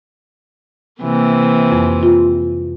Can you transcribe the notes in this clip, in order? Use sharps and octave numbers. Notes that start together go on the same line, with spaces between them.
C3 E3 A#3
F2
F4